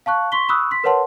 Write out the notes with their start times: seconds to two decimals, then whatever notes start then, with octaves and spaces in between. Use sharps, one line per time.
0.06 F5 A5 C#6 F#6
0.32 C6 C#6 B6 G7
0.49 B5 C#6 D#6 E6 F#6
0.71 C6 B6
0.84 A#4 B4 C#5 F#5 A5 C6